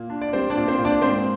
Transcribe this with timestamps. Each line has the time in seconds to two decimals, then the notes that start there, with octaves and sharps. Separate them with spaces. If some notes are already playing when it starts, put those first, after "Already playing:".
Already playing: A#2 A#3
0.10 D4
0.21 D5
0.33 G3 C4 C5
0.50 D4 D5
0.57 A#2
0.68 C4 C5
0.79 A#2
0.85 D4 D5
1.02 G#2 C4 C5